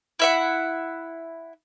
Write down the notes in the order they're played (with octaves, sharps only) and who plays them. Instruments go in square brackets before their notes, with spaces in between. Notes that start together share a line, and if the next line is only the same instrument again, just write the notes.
[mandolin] E4 E5 F#5